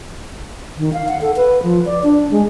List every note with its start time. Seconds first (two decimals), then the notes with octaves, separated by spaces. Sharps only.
0.78 D#3
0.93 F5
1.08 F#5
1.21 A4
1.36 B4
1.63 F3
1.85 D5
2.03 D4
2.31 G#3